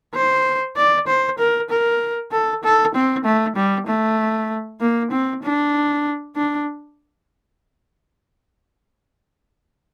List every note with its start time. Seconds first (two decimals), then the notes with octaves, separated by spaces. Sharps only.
0.15 C5
0.76 D5
1.07 C5
1.39 A#4
1.70 A#4
2.32 A4
2.64 A4
2.95 C4
3.25 A3
3.56 G3
3.87 A3
4.81 A#3
5.11 C4
5.43 D4
6.36 D4